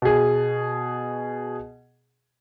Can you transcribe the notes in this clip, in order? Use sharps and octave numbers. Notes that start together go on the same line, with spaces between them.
B2 G#4